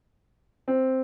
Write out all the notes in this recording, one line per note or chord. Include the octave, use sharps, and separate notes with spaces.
C4